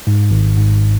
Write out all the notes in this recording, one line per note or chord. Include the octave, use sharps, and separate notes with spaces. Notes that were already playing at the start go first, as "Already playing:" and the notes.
G#2
G#1
G#2